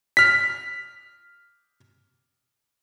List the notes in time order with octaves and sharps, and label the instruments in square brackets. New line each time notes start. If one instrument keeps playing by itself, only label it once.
[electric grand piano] F6 B6